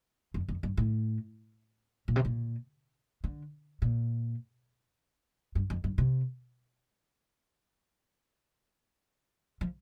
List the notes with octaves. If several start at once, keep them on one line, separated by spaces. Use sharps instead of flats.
F2
F2
G2
A2
A#2
C3
A#2
D3
A#2
G2
F2
G2
C3
F3